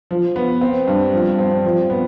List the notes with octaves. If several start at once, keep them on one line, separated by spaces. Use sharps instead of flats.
F3
B3
C4
G2
F3
C4
F3
B3